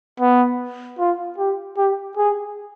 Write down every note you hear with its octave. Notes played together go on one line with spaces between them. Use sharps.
B3
F4
G4
G4
G#4